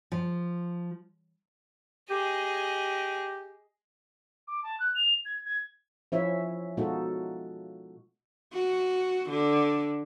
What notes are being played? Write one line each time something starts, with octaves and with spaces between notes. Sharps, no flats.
F3
G4 G#4 D#5
D6
A5
F#6
F7
G#6
G#6
F3 C#4 E4 F4 C#5 E5
B2 G#3 D#4 F4 F#4 A4
F#4
D3